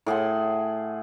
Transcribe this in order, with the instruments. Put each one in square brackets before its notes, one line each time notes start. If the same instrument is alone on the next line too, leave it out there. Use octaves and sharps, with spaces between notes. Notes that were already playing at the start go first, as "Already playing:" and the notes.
[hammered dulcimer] A2 G#4 F#5 C6